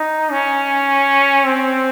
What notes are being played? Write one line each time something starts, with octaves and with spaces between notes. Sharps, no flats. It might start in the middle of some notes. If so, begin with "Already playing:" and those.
Already playing: D#4
C#4
C4